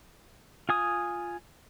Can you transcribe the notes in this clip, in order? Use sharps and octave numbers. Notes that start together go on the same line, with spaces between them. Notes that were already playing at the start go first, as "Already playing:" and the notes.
F4 G#5 D#6